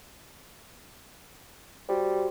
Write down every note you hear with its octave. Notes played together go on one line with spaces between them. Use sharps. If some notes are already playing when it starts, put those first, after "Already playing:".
G3 F#4 G4 C5